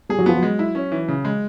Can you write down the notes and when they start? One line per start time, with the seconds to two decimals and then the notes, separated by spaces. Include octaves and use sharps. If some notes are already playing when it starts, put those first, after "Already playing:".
0.09 G3 G#4
0.18 F#3
0.26 F3 B3
0.37 F#3
0.43 G#3
0.59 E4
0.75 C#4
0.92 E3
1.08 C#3
1.25 G#3